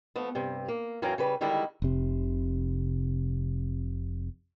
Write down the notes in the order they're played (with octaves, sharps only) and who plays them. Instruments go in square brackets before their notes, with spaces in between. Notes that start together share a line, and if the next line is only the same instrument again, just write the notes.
[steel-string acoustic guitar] F3 A3 B3
G2 C3
A#3
F#2 E3 C#4 F5 G5 A#5
C#3 G3 B4
D3 D#3 G3 G#3 E4
[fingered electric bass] F1 C3